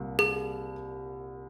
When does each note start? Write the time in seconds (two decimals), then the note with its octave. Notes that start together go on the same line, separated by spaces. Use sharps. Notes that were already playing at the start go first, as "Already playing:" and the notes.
Already playing: C2 A#2 G3 A#3
0.19 G#4